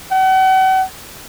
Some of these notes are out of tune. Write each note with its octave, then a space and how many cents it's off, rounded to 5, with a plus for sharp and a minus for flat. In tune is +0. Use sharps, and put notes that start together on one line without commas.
F#5 +40